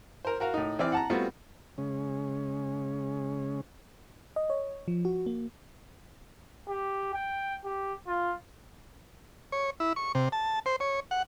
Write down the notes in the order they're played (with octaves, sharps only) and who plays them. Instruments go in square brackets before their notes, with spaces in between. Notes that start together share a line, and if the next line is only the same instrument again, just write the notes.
[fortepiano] A#4 C5
F#4 A#4 F5
A2 D#4
E3 C4 E4 D5 F6
F#5 A5 A#5
G3 A3 B3 C4 F4 F#4
[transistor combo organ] C#3 G#3 C#4
[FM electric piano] D#5
C#5
F3
F#4
A#3
[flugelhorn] G4
G5
G4
F4
[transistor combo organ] C#5
E4
C#6
C3
A5
C5
C#5
F#5